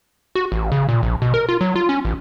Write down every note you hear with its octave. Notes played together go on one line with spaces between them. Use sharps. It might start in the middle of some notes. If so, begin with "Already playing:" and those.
F#4
A1
C#3
A#2
A#1
B2
A#4
F4
F#3
F4
C#4
A1